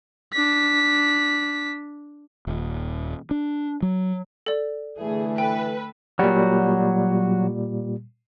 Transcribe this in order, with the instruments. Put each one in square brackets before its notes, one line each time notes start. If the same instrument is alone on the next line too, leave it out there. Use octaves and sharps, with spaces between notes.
[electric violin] D4 B6
[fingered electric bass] D#1
D4
F#3
[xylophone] A4 D5
[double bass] D3 A3 [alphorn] E3 [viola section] G#4
[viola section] A4 B4 [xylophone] G5
[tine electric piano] A#2 G3 [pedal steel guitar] F#3 F#4